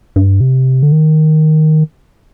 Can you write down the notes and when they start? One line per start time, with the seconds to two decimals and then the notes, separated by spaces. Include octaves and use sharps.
0.16 G2
0.41 C3
0.83 D3
0.92 D#3